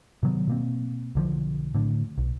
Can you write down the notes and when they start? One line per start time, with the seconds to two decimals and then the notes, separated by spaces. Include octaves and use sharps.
0.23 C3 D#3 F#3 B3
0.48 B2 A#3 C4
1.15 B1 D3 F3
1.75 A2 D3
2.18 B1